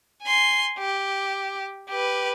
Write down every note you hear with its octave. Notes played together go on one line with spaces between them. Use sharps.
G#5 C6
G4
G4 B4